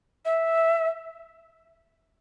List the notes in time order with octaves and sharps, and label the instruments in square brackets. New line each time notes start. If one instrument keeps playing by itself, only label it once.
[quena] E5